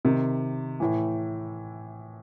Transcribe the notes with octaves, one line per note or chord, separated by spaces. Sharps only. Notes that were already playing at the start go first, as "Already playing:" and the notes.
C3 D#3
A2 E3